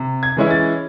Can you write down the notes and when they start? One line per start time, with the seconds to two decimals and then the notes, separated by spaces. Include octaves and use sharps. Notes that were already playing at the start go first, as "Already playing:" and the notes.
Already playing: C3
0.23 G#6
0.37 E3 G#3 C#4 E4
0.50 A6